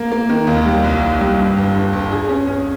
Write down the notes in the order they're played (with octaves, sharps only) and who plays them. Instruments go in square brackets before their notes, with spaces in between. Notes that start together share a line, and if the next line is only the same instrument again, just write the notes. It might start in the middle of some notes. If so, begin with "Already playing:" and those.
Already playing: [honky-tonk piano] A#3
A#3
D#3
D#2
G3
C2
C2
G3
G2
G1
G2
G1
G#4
C#4
C#4